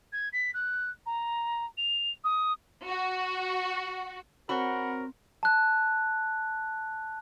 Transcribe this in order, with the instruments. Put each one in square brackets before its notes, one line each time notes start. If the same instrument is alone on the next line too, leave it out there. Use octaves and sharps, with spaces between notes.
[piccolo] G#6
B6
F#6
A#5
F7
D#6
[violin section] F#4
[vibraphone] C4 [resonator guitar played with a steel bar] F#4 C5 C#5 [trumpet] A#4 [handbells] F#5 B5
[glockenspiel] A5 F#6